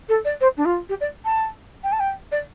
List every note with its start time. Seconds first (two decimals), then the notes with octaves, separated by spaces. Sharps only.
0.09 A4
0.25 D5
0.41 C5
0.57 D4
0.65 F4
0.89 G4
1.01 D5
1.25 A5
1.84 G5
1.92 A5
2.00 G5
2.32 D5